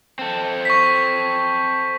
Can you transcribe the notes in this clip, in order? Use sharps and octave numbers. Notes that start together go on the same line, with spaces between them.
C4 A4
C#6 B6